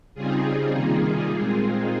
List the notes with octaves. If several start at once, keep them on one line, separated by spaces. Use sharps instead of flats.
C#3 G3 C4 D#4 F4 G#4
C3 D#3 G3 A#3 D#4 F4 G#4
A#2 G#3 C4 D#4